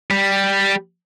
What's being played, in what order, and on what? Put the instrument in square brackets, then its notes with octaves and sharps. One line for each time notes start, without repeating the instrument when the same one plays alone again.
[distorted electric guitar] G3